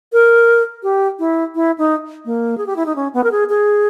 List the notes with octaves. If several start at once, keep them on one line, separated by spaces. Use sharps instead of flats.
A#4
G4
E4
E4
D#4
A#3
G#4
G4
E4
D#4
C#4
B3
A#4
G#4
G#4